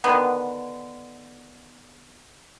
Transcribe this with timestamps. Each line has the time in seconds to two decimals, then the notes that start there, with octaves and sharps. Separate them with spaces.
0.04 D3 D#3 B3